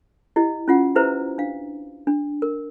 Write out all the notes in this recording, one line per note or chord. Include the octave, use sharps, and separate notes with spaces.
E4 G4 D#5
C#4 F4 F#5
E4 G4 B4 C5 E5 A#5
D4 F5
D4
A#4